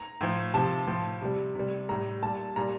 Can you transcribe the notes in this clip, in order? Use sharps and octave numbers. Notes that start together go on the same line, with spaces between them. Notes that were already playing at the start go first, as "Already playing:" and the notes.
Already playing: A#5
A2 F3
C3 F3 A5
A2 F3
C3 G3
C3 G3
A2 G3 A#5
A#2 G3 A5
A#2 G3 A#5